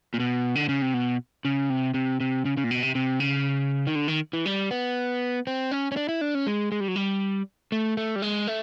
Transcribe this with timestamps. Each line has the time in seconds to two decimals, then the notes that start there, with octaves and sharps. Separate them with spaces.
0.14 A#2
0.20 B2
0.55 D3
0.69 C#3
0.82 C3
0.94 B2
1.45 C#3
1.70 C3
1.94 C3
2.20 C3
2.45 C#3
2.57 C#3
2.64 A#2
2.71 B2
2.83 C3
2.95 C3
3.20 C#3
3.87 D#3
3.95 D3
4.08 D#3
4.33 E3
4.46 G3
4.71 B3
5.47 C4
5.71 C#4
5.92 C#4
5.97 D4
6.09 E4
6.21 D4
6.35 C#4
6.47 G#3
6.72 G#3
6.80 G3
6.88 F#3
6.96 G3
7.72 A3
7.97 A3
8.16 G3
8.22 G#3
8.47 A3